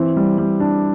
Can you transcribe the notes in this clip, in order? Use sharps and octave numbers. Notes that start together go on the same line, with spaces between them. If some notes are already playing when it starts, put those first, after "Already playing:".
Already playing: E3 C4
G3
G3
D4